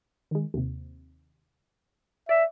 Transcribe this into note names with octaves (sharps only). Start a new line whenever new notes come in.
D#3 G#3
D#2 C3
D5 E5